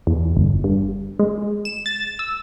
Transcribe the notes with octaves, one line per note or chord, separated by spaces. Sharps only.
E2
G1
G2
G#3
E7
A6
E6